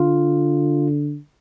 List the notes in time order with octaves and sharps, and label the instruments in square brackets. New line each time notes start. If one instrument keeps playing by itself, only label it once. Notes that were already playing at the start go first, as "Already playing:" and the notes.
Already playing: [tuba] D3 [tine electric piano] F4